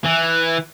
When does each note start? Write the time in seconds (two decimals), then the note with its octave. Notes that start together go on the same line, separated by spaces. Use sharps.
0.06 E3